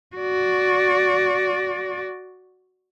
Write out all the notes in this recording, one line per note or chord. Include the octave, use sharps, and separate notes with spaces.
F#4 D5